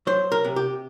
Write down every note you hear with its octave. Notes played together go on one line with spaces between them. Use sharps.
F#3 C5
A#4
C3
G4